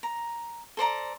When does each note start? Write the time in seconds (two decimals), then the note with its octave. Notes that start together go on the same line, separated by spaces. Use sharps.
0.03 A#5
0.77 A4 C5 D5 A#5